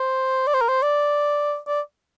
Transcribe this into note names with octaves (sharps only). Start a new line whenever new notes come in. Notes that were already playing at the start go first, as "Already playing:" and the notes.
Already playing: C5
D5
C5
A#4
C5
D5
D5